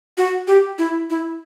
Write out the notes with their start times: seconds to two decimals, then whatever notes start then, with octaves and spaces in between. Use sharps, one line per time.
0.18 F#4
0.47 G4
0.78 E4
1.10 E4